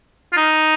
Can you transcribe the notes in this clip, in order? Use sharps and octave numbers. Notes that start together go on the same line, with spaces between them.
F4
D#4